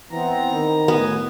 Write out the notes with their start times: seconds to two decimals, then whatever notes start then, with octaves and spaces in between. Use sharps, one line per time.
0.11 E3 B3 C4 A#5
0.53 D#3
0.88 A2 B3 G#5